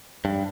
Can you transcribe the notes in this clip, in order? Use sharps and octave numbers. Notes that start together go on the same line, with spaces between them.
G2